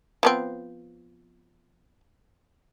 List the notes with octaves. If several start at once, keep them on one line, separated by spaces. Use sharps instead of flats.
F3 B3 C4